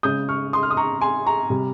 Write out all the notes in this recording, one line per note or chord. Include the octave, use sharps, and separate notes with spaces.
C#3 G#3 C#4 D#6 G6
C#6 F6
C6 D#6
F6
D#6
A#5 C#6
G#5 C6
A#5 C#6
C3 G3